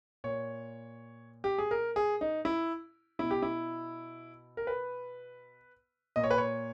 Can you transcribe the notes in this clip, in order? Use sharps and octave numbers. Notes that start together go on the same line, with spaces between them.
A#2 C#5
G4
G#4
A#4
G#4
D#4
E4
B2 E4
G4
E4
A#4
B4
A#2 D#5
C#5
B4
C#5